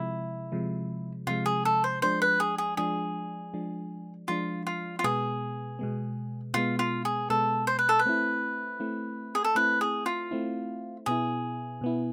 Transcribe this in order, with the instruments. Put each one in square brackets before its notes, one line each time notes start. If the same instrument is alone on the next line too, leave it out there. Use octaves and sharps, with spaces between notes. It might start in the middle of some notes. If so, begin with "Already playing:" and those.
Already playing: [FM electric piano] C3 F3 G#3 [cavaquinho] E4
[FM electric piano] C3 F3 G#3
[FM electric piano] C3 F3 G#3 [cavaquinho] F4
[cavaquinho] G#4
A4
C5
[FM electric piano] F3 G#3 D4 [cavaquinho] C5
[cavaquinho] B4
G#4
G#4
[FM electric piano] F3 G#3 D4 [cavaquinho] G#4
[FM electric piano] F3 G#3 D4
[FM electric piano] F3 G#3 D4 [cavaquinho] F4
[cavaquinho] F4
F4
[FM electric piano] B2 G#3 B3 [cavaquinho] G#4
[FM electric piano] B2 G#3 B3
[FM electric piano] B2 G#3 B3 [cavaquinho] F4
[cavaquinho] F4
G#4
[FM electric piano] B2 G#3 B3 [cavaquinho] A4
[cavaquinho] C5
B4
A4
B4
[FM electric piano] A3 C4 E4
A3 C4 E4
[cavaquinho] G#4
A4
[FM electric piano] A3 C4 E4 [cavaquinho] B4
[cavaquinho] G#4
F4
[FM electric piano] A3 C4 E4
[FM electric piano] B2 B3 E4 [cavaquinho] G#4
[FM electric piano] B2 B3 E4